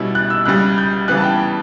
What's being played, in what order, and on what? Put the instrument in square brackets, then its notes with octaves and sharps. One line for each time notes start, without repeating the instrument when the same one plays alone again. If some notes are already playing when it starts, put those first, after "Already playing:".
Already playing: [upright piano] B2 G3 C#4 E4
[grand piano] F#6
E6
[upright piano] C#2 C#3 G3 [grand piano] F#6
[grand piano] G6
[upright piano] C#3 E3 G3 B3 [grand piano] F#6
[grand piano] A5
G5
A5